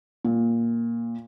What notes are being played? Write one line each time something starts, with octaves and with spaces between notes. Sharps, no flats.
A#2